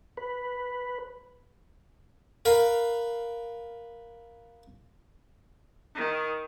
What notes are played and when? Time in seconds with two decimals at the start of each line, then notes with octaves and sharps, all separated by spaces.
0.17 B4
2.45 A#4 B4 F5
5.95 D#3